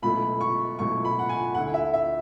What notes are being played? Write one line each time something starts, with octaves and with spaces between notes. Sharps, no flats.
C#2 B2 F#3 A3 E4 B5
C#6
C#2 B2 F#3 A3 E4 C#6
B5
F#5
G#5
D2 D3 A3 E4 F#5
E5
E5